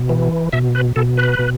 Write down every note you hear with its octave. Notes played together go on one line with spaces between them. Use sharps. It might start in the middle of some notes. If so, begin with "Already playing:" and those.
Already playing: B2
E3
B2 E5
B4
B2 A4
B4
B2